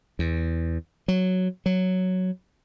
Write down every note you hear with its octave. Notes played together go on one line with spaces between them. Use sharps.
E2
F#3
F#3